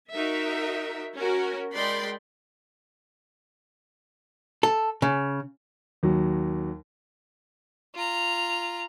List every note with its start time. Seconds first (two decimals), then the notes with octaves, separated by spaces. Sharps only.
0.11 D#4 F#4 A#4 E5
1.16 C#4 F#4 A#4
1.74 G#3 A#4 D5 G5 B5 C6
4.63 A4
5.02 C#3
6.03 D#2 F#3
7.95 F4 A#5